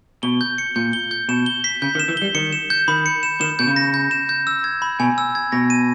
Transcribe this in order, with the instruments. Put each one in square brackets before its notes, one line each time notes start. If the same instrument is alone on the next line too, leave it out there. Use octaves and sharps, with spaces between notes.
[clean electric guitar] B2 [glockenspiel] G7
[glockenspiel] G6
C#7
[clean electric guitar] A#2 [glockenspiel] G6
[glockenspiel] G7
G6
[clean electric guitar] B2 [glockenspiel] E7
[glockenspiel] G7
B6
[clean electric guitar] C#3 [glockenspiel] G6
[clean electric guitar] D#3
[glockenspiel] E7
[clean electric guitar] E3
[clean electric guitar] G3 [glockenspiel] G7
[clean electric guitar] D#3 [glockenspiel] C#7
[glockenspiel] E7
G6
[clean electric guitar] D#3 [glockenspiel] B5
[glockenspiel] C#7
E7
[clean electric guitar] D#3 [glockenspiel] E7
[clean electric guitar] B2 [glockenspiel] G6
[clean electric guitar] C#3
[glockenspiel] A#6
G6
E7
G6
E6
G#6
B5
[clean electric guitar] B2 [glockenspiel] G#5
[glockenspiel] E6
G#6
[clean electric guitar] B2 [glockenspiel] A#6
[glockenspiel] D#7